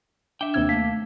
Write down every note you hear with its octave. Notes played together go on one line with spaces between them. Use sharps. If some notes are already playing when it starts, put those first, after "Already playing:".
D4 E5 G5
D#2 C3 E6 G#6
A3 A#3 F5 B6